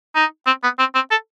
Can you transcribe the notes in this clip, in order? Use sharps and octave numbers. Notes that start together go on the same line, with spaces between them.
D#4
C4
B3
C4
C4
A4